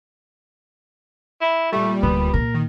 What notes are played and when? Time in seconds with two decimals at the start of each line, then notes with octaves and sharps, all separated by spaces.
1.41 E4
1.73 A#2 G3 A3
2.03 D1 D2 B3
2.34 A#2 A#4
2.54 D#3